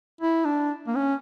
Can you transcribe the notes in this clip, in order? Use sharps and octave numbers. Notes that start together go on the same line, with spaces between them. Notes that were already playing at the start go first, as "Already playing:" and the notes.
E4
D4
A#3
C#4